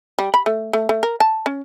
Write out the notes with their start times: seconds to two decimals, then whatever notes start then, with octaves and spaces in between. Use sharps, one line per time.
0.19 G3
0.34 B5
0.46 A3
0.73 A3
0.89 A3
1.03 A#4
1.20 A5
1.46 C#4